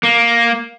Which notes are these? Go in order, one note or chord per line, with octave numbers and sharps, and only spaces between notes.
A#3